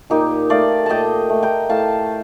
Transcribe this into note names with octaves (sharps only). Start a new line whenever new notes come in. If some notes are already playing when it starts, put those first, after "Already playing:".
A#2 D#4 G4
A3 D5 F5
A#2 D#5 G5 A5
A3
G5 A#5
A2 F5 A5